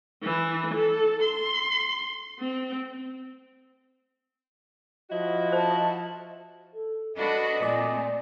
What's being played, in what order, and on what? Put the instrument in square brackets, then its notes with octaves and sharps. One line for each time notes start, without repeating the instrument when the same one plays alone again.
[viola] E3
A4
C6
C4
[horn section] F3 E4 F#4 [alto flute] D#5
[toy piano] C5 [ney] A5
[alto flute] A4
[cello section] D4 F#4 B4 [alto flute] A4 [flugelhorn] D#5
[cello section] A#2 A3 C4 [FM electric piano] D5 [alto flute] G#5